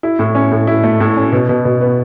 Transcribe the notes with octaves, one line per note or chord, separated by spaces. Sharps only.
E4
A2
C#4
A2
E4
A3
A2
C#4
B2
B2
B2
B3